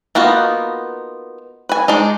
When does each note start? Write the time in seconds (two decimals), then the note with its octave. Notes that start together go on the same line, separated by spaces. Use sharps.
0.15 A#3 B3 D#4 F4 F#4
1.69 B4 G#5
1.88 G#3 D4 D#4